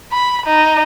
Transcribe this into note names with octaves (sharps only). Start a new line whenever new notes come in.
B5
D#4